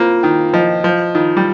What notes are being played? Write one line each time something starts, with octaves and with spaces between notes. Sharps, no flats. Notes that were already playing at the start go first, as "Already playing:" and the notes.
Already playing: A#3 C4 F4
D#3 G5
F3 D#5
F3 F4
D#3 F4
G3